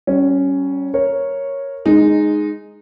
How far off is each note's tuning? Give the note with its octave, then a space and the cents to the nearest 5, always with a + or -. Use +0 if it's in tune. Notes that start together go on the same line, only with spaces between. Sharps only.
G3 -35 C#4 +0
A#4 +0 C#5 -5
G#3 +0 D#4 -15